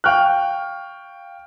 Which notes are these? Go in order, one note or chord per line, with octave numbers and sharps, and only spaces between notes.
F5 G5 C#6 F6 F#6